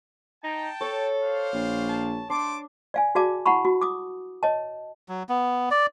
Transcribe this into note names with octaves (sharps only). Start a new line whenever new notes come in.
D#4 G5 A5
A4 C#5
C5 D5 F5
A#1
A5
A3 D4 A5 C6 D6
D5 F5 G#5
F#4 G#4 D5 F5 A5 D6
E4 F#5 A5 B5 C#6
F#4
D6 D#6
C#5 D#5 A5
F#3
B3
D5